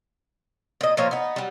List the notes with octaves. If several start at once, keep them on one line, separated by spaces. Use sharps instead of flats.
A#2 D#5
A#2 F3 A#3 C#5
B3 D#4
F#3 G3